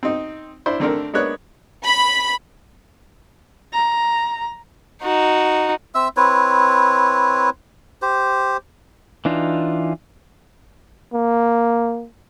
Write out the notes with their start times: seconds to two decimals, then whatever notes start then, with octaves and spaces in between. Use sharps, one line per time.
0.03 C4 D#4
0.66 D4 E4 C5
0.80 D3 A3 C4 D4 A4 A#4
1.14 G#3 A#3 B3 D4 C#5 F#6
1.84 B5
3.73 A#5
5.02 D#4 F#4
5.95 C4 E5 E6
6.17 C4 E4 B4 C#5
8.02 G4 C5
9.25 E3 D4 D#4 F4
11.13 A#3